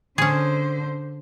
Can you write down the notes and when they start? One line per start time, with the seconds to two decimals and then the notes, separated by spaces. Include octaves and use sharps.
0.18 D3 C#4 G#4 C5